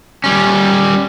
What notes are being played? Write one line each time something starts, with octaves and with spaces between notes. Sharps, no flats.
G3 C#4